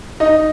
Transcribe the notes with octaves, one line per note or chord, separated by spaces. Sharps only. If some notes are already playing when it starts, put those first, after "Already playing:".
D#4 D#5